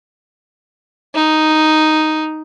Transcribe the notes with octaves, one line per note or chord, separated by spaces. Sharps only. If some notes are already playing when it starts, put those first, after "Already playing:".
D#4